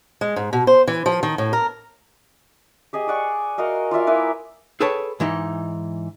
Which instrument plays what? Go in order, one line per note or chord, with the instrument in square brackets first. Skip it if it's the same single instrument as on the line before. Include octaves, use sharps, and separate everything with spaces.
[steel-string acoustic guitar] G#3
G#2
B2
C5
E3
F3
D#3
A2
A#4
[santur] G4 G#4 D#5 G5
G#4 D5 F#5 C#6
F#4 A#4 D#5 F5
F4 D5 E5 F5
A#3 E4 A#4 B4
[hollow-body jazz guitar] G#4 A4 B4 C#5 G5 A5
G#2 E3 D#4